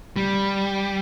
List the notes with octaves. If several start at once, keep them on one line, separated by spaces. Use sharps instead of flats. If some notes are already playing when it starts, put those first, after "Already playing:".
G3